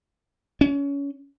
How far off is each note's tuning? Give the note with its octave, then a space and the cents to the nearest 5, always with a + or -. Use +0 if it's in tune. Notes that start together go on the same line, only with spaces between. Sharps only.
C#4 +25